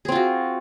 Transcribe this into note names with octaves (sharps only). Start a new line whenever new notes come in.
C4 F4 F#4 G#4